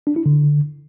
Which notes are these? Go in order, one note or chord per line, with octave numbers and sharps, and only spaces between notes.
D4
E4
D3